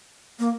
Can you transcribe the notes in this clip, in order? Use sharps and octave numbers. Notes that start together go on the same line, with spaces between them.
A#3